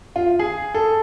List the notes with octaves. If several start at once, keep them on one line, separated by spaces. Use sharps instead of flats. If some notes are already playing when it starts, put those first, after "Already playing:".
F4
G#4
A4